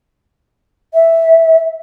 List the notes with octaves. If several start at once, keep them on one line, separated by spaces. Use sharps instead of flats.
E5